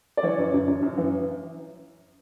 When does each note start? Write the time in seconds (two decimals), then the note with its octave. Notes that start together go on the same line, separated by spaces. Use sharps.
0.17 D5
0.23 E3 C#5
0.38 F#2
0.54 F#2
0.67 F#2
0.82 F#2
0.98 E3